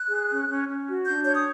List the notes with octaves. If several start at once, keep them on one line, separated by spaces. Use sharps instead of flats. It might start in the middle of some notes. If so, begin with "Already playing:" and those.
Already playing: F#6
G#4
C#4
C#4
C#4
F#4
D4 G6
C#5 G6
D#6